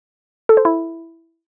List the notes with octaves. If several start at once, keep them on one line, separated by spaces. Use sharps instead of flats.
A4
C5
E4